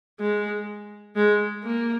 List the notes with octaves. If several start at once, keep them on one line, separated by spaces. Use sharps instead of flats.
G#3
G#3
A#3